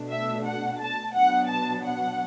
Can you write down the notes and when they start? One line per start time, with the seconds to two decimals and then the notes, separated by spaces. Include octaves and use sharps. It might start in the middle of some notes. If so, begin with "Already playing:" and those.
Already playing: B2 A3 D4
0.10 E5
0.45 F#5
0.80 A5
1.14 B2 F#3 B3 D4 F#5
1.49 A5
1.85 F#5